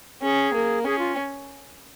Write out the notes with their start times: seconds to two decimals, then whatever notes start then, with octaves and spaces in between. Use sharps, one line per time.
0.22 C#4 G#4
0.54 A#3
0.85 C#4 G#4
0.99 F4